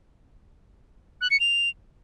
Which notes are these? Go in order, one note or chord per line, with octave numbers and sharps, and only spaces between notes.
F#6
C#7
F7